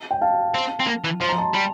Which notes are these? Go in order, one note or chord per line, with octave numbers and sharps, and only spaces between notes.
G5
F5 A5
C4
C4
A#3
E3
F3 C6
A#5
A5 C6
G3